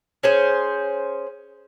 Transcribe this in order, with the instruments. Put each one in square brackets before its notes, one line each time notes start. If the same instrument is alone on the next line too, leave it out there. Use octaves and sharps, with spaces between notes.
[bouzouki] C#4 G#4 C5